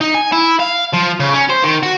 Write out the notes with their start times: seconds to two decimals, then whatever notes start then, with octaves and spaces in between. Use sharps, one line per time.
0.01 D#4
0.14 G#5
0.32 E4
0.59 F5
0.93 F3
1.20 C#3
1.34 C#4
1.50 C5
1.64 D#3
1.83 F#4